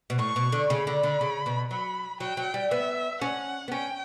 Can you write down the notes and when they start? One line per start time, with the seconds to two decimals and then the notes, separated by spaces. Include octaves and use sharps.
0.10 B2
0.19 A2 C#6
0.36 B2
0.52 D3
0.70 C#3 B5
0.87 D3
1.03 D3
1.21 C#3
1.46 B2
1.71 F#3 B5
2.20 F#3 G5
2.37 F#3
2.54 G3
2.71 B3 E5
3.21 C#4 F#5
3.68 B3
3.72 C#4 G5